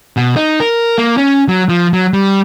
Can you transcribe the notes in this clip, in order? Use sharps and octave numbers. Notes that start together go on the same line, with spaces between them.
B2
D#4
A#4
A#3
C#4
F#3
F3
F#3
G3